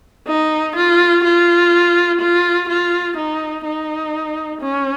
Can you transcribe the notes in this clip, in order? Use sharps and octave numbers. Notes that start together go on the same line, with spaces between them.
D#4
F4
F4
F4
F4
D#4
D#4
C#4